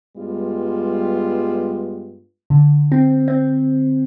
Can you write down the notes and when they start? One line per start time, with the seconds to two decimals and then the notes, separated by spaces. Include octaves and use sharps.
0.16 G2 G3 G#3 B3 F4
2.50 D3
2.92 C4
3.28 C4